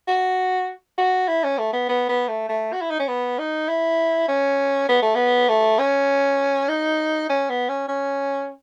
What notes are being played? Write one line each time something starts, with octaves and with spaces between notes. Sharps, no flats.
F#4
F#4
E4
C#4
A3
B3
B3
B3
A3
A3
F#4
E4
D#4
C#4
B3
D#4
E4
C#4
B3
A3
B3
A3
C#4
D#4
C#4
B3
C#4
C#4